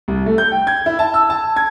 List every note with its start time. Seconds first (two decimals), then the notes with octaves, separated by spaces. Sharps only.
0.08 C2
0.26 A3
0.38 G6
0.52 G5
0.67 G#6
0.86 E4
0.99 A5
1.14 E6
1.30 A5
1.56 G#6